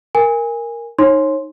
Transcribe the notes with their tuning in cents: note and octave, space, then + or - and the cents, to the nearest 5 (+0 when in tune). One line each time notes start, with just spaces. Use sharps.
A#4 +0 G#5 -20
D#4 +0 C#5 -30 C6 +0